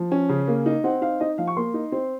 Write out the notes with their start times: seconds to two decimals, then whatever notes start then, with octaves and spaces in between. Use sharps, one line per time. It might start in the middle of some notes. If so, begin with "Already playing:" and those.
Already playing: F3
0.12 C#4
0.29 C#3
0.48 A#3
0.66 D#4
0.84 C4 F#5
1.02 D#4 F5
1.20 D#4 D#5
1.38 F3 F5
1.47 C#6
1.57 A#3 C6
1.74 D#4
1.92 C4